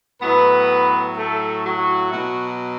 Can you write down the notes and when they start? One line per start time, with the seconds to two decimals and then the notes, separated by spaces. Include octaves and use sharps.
0.21 A2 F#3 B3 B4
1.16 A3 A4
1.65 F#3 F#4
2.12 B2 F#3